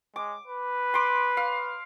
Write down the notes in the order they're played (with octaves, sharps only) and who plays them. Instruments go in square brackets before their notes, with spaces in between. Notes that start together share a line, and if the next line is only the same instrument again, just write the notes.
[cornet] G#3 [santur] D6
[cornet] B4
[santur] C6 D6
F5